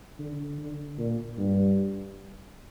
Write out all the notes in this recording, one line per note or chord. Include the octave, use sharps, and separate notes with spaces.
D3
D3
A#2
G2